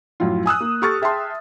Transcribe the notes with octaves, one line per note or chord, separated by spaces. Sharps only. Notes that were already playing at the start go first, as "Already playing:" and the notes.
F#2 A2 F3 F4
G#5 D#6 E6 F#6
A#3
G4 A4 C#6 F6 A6
G#4 E5 G5 A5 C6